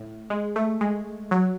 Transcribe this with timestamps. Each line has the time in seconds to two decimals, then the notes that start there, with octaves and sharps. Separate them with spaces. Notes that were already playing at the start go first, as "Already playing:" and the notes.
Already playing: A2
0.30 G#3
0.56 A3
0.81 G#3
1.31 F#3